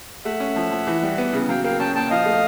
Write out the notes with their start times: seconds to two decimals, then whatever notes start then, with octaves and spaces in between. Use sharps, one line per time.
0.25 A3 E5 F#5
0.40 C#4
0.56 F3
0.71 F3
0.87 E3
1.03 G3
1.18 B3
1.33 C#3
1.49 F#3 F5 G5
1.64 A#3 F5 G5
1.79 C#4 G5 A5
1.95 A#2 G5 A5
2.10 F3 D#5 F5
2.26 A3